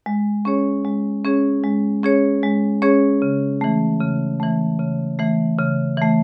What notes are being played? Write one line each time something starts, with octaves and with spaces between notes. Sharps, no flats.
G#3
C#4 G#4 C#5
G#3
C#4 G#4 C#5
G#3
C#4 G#4 C#5
G#3
C#4 G#4 C#5
C#3
E3 A3
C#3
E3 A3
C#3
E3 A3
C#3
E3 A3